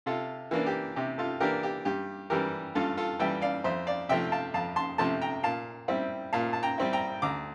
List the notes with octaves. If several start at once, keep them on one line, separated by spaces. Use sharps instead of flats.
C3 F4 A4
E3 A#3 D4
G4
C3 G4
F4 A4
E3 A#3 D4 G4 A#4
G4
G2 G4
E3 G3 G4 A#4
G2 F4 A4
F4 A4
E3 G3 E5 G5
D5 F5
F2 C5 E5
D5 F5
C3 F3 A3 E5 G5
F5 A5
F2 F5 A5
A5 C6
C3 F3 A3 A5 C6
G5 A#5
A#2 F5 A5
G3 C4 E4
A#2 F5 A5
A5
G5 A#5
G3 C4 E4
G5 A#5
D2 A#5 D6